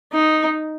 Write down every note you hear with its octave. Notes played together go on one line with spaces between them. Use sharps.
D#4